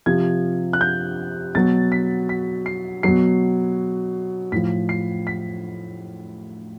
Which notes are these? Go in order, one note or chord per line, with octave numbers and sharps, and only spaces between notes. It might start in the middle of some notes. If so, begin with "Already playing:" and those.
C3 F3 G#6
F#6
G6
B2 F#3 A6
B6
B6
C7
B2 F#3 C7
A2 F3 B6
C7
B6